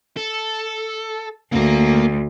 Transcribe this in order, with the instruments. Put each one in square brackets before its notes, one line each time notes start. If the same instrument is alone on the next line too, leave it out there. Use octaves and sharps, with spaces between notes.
[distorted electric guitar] A4
[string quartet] D2 [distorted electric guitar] A#3 A#5